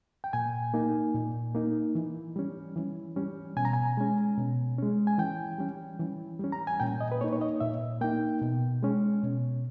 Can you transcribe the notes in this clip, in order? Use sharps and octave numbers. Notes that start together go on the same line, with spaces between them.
G5
A#2 G#5
A#3 D#4
A#2
A#3 D#4
E3
G3 C#4
E3
G3 C#4
B2 G#5
A#5
G#5
G#3 C#4
B2
G#3 C#4
G#5
E3 G5
G3 C#4
E3
G3 C#4
A#5
G#5
A#2 G5
D#5
B4
A#3 D#4 C#5
C#5
D#5
A#2 E5
A#3 D#4 G5
B2
G#3 C#4
B2